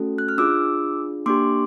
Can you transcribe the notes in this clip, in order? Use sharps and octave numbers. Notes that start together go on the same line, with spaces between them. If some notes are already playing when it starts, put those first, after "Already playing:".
Already playing: A3 C#4 F#4 A4
F#6
F6
D4 F4 G#4 D6 E6
A#3 D4 G4 C6 D6